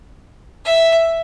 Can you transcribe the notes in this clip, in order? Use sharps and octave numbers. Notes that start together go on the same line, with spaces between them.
E5